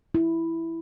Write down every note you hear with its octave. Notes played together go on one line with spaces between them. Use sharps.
E4